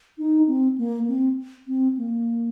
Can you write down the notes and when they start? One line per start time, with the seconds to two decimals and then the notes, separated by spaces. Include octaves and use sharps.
0.18 D#4
0.47 C4
0.78 A#3
1.08 C4
1.67 C4
1.97 A#3